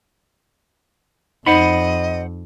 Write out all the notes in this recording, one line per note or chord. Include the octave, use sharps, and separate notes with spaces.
F2 D#4 C5 D#5 F#5 B5